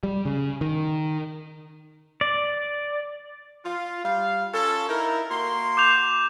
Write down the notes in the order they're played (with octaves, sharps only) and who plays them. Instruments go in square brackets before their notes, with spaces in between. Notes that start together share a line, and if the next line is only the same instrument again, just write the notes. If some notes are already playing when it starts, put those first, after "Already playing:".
[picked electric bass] G3
C#3
D#3
[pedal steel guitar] D5
[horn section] F4
G3 F5
C#4 F4 A4
D#4 E4 A#4
A#3 F#4 C6
[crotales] D6 G6 F7